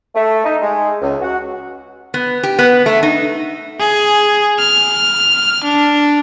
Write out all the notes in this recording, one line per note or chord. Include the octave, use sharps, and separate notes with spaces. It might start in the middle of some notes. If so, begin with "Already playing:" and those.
A3
D#4
G#3
C#2
F#4
B3
G4
B3
A3
D#4
G#4
F6
D4